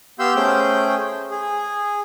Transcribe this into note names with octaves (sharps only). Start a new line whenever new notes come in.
B3 G4 F5 C6 E6 G6
A3 C#4 G#4 C5 G5 G6
G#4